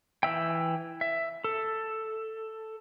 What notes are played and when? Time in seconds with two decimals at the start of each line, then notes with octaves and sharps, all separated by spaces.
0.23 E3 E5 G5
1.01 E5
1.44 A4